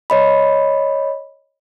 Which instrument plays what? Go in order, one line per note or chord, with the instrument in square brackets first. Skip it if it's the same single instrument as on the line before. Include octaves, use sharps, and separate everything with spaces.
[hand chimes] C#5 D#5 B5